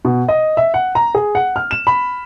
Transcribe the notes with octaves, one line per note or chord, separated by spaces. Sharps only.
B2
D#5
E5
F#5
A#5
G#4
F#5
F6
E7
B5